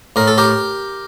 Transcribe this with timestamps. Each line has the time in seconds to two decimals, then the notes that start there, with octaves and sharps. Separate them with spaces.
0.16 A2 A#4
0.27 A4
0.38 G4 A#4